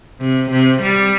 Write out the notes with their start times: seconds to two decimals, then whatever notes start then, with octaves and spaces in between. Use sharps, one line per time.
0.20 C3
0.50 C3
0.81 G3